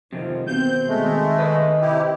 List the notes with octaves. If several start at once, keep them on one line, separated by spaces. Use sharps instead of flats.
F2 C3 D#3 F3
B2 C4 G6
D#3 G#3 A3
B4 D#5
C3 E4 G4